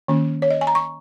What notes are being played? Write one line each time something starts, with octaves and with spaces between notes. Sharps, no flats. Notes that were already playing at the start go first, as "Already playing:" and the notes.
D#3 A#3 C#4
C#5
D#5
G#5
A#5
C#6